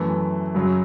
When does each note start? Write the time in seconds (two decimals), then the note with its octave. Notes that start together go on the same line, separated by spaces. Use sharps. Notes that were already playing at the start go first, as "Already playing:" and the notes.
Already playing: F#2 E3 A3
0.55 F#2 C#3 F#3